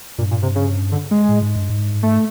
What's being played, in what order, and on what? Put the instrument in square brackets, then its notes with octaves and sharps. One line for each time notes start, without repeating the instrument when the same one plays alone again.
[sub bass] G2 [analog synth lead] A#2
[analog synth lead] A#2
C3
C#3
D3
G#3
[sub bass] A2
G#2
G2
G#2
[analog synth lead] A3